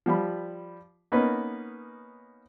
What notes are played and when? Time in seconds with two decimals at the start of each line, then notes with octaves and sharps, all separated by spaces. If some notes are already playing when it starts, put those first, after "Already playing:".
0.06 F3 G3 B5
1.12 A#3 B3 C#4 D#4 B4